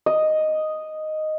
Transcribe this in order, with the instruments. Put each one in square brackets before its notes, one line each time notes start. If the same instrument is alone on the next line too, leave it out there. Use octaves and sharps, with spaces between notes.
[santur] D#5